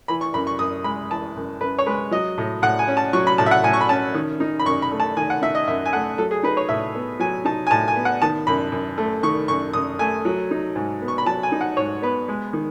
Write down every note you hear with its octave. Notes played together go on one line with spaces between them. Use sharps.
E3 B5
C#6
F#2 B5
C#6
F#2 D#6
G#3 B5
E3 A5
F#2
F#2 B4
C#5
G#3 B4
F#3 D#5
A2
A2 F#5
G#5
C#4
A5
F#3 C#6
B5
A2 A5
E5
F#5
A2 G#5
C#6
B5
C#4 A5
D#3
D#4
B5
F#2 C#6
B5
A3
A5
D#3 G#5
F#5
D#4 E5
D#5
F#2 E5
G#5
A3 F#5
F#3 A4
G#4
D#4 B4
C#5
A2 E5
B3
F#3 G#5
D#4 A5
G#5
A2 A5
G#5
B3
F#5
D#3 A5
F#2 B5
F#2
A3
D#3 C#6
F#2 C#6
F#2 D#6
A3 G#5
F#3
D#4
G#2
B3
C#6
B5
F#3 A5
G#5
D#4
F#5
G#2 C#5
B3 B4
G#3
D#3